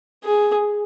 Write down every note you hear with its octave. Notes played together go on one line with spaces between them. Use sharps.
G#4